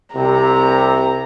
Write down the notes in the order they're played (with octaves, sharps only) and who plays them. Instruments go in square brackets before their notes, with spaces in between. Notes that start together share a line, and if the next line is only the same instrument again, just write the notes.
[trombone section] C2 C3 [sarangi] A#5